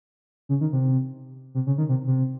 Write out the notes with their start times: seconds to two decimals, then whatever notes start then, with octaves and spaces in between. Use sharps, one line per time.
0.49 C#3
0.61 D#3
0.73 C3
1.55 C3
1.67 C#3
1.78 D#3
1.89 C3
2.07 C3